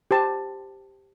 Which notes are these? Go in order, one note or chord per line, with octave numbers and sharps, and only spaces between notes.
G4 C5 A5